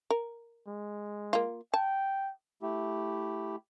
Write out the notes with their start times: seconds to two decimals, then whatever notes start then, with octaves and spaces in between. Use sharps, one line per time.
0.10 A#4
0.67 G#3
1.33 A#3 F4
1.74 G5 A5
2.62 A3 E4 G4